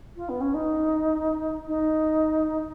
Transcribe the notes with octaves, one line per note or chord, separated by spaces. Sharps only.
F4
B3
C#4
D#4
D#4